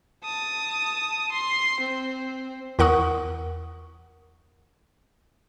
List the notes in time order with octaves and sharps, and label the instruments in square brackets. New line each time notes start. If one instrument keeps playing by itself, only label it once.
[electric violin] A5 D#6
C6
C4
[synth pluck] E2 A#4 F#5 C#6 D#6